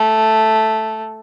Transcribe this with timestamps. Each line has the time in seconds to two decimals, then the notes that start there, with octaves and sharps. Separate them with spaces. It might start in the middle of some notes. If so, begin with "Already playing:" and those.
Already playing: A3